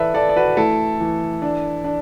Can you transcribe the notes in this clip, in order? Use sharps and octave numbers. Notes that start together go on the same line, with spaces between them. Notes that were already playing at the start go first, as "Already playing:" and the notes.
Already playing: E3 A4 B4 D5 E5
E3 A4 D5
D5
F#4 B4
A3 E4 A4
E3
D4
D4